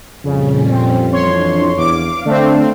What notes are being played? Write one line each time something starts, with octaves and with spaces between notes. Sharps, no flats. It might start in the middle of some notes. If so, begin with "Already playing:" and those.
F2 A#2 C#3 G3 C#4
C4
E3 D4 C#5 C6
E2 F5 D6
D3 A3 C4 D4